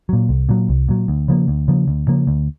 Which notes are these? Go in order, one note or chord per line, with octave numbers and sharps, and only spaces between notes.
A#2 F#3
C2
A#2 F#3
C2
A#2 F#3
D2
C#3 F3 A#3
D2
C#3 F3 A#3
D2
C#3 F3 A#3
D2